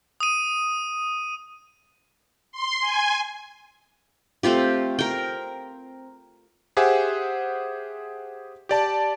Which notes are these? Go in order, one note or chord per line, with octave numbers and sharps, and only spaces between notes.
D#6 D#7
C6
G#5
A3 C4 F4 G4
A#4 G5
G4 G#4 C5 E5 F#5 G#5
G4 D5 A5